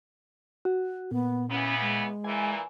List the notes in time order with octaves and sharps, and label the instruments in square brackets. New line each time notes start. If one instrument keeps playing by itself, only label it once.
[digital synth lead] F#4
[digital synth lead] A#2 [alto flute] B3
[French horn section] C#3 E3 B3 [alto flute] C#4
[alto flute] G#3
[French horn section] A#2 E3 [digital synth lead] G#5